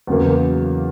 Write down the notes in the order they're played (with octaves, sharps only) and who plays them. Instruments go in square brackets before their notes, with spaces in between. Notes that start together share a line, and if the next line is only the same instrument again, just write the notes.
[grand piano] E2 C#3 F#3 A#3